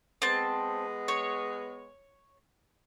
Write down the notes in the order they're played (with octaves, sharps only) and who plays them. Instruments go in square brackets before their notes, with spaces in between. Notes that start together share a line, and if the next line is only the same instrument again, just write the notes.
[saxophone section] G#3 B3 [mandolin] C4 A5
[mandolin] C#5